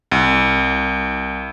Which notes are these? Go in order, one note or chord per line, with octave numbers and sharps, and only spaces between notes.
C2